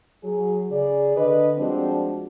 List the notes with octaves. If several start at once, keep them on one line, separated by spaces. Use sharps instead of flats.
F#3 G#4
C#3 G#4 D5
D3 B4 D#5
F3 G3 G#3 C4 D4 F#4